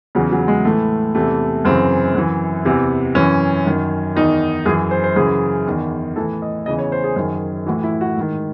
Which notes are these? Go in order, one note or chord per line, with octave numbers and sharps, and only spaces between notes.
E2 C#3 E3 F#3
F#3
G#3
A2 E3 A3
E2 C3 E3 A3
F#2 C#3 E3 C4
F#2 E3
E2 C3 E3
F#2 E3 C#4
F#2 D#3
E2 D#3 D#4
F#2 E3 G#4
C5
C5
F#2 C#3 E3 G#4
E2 D#3
A2 E3 A4
D#5
E2 C#3 E3 D#5
C#5
C5
G#4
F#2 D#3 G#4
A2 E3 F#4
E4
F#4
G#2 D#3